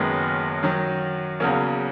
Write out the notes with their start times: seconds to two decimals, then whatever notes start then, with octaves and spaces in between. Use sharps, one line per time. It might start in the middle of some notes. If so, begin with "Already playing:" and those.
Already playing: F#1 F#2 D#3 G#3 B3
0.63 F#2 D#3 F#3
1.40 E2 C#3 F#3 A#3 C#4